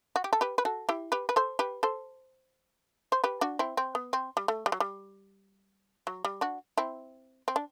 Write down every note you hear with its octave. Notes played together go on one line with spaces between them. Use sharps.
F#4
G4
A4
G4 B4
B4
F#4 A4
E4 G4
G4 B4
B4
A4 C5
G4 B4
A4 C5
C5
G4 B4
D4 F#4
C4 E4
C4
B3
C4
G3
A3
G3
F#3
G3
F#3
G3
D4 F#4
C4 E4
C4
D4